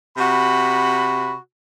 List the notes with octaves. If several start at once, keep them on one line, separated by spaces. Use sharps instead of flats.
C3 F#4 B5